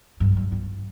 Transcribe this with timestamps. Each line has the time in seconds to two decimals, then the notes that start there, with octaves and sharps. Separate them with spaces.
0.20 G2
0.37 G2
0.52 G2